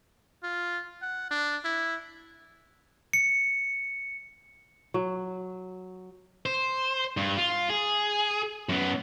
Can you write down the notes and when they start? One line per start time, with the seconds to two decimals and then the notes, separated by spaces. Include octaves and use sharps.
0.44 F4
1.02 F#5
1.31 D4
1.65 E4
3.13 C#7
4.94 F#3
6.46 C5
7.17 G2
7.37 F4
7.70 G#4
8.69 F#2 B3